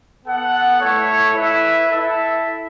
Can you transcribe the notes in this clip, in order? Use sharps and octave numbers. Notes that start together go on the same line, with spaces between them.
B3 A4 F#5
A3 E4 A4 C#5
E4 B4 E5
E4 A4 E5